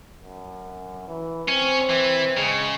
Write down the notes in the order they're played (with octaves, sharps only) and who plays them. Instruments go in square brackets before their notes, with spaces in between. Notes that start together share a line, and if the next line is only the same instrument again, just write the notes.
[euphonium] F#2
E3
[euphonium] C4 [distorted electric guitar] C#4
[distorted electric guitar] E3
[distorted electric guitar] C#3 [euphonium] G#3